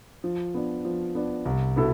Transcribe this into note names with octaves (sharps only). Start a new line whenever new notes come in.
F3
B3 D4
F3
B3 D4
C2
B2 B3 E4 A4